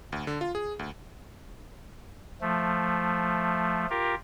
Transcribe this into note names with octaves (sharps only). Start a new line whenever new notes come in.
D2
D3
F4
G#4
D2
F3 A3
F4 G4 A#4